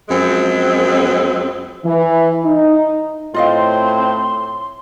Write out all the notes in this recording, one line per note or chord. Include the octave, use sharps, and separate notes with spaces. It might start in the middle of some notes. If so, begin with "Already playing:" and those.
F#2 F3 G#3 C4
E3
D#4
A2 C4 F4 D#5 F5 C6